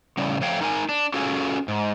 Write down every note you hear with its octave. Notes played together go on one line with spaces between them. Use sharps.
A2 C#3 G3
F3 A3 C#5 F5 G5
D#4 A#4 G#5
D4
C#4 F4 F#4 G#4 A4
G#2